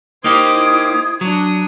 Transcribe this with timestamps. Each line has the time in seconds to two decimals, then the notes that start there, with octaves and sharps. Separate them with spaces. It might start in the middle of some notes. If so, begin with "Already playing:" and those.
0.24 A#3 D#4 E4 G4 C5 D6 D#6 G#6
1.21 F#3 D4 D#6